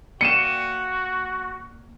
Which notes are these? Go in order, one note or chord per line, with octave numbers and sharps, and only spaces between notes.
A#3 F#4 D5 G5 C#7 D#7 E7